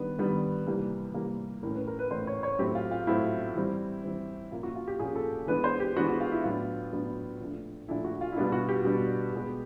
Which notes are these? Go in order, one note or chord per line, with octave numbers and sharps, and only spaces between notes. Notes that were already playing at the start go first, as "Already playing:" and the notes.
Already playing: D#3 G3 B3 D4 B4
D#3 G3 B3 D4
C3 E3 G3 A#3
C3 E3 G3 A#3
A2 E3 A3 C#4 A#4
B4
A#4
B4
A2 E3 A3 C#4 C5
C#5
C#5
A2 F#3 A3 C4 G4
F4
F4
A2 F#3 A3 C4 E4
E3 G3 C4
E3 G3 C4
A#2 F3 A#3 C#4 F4
F#4
F4
G4
A#2 F3 A#3 C#4 G#4
A4
E3 G#3 B3 D4 B4
C5
G4
E3 G#3 B3 D4 F#4
F#4
F4
E4
A2 F#3 B3 D4 F4
A2 F#3 B3 D4
A#2 F3 A3 D4
A#2 F3 A3 D4 E4
F#4
F4
E4
B2 G3 B3 D4 F4
F#4
G4
B2 G3 B3 D4
B2 G#3 B3